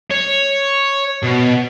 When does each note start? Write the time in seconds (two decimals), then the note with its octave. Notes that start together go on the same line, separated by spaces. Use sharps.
0.11 C#5
1.23 B2